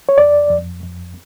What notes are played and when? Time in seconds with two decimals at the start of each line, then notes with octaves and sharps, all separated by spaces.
0.09 C#5
0.18 F2 D5
0.50 F2
0.83 F2